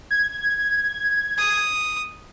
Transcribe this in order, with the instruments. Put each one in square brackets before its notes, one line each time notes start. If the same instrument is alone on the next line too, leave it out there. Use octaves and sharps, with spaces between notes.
[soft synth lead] G#6
[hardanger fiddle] D#6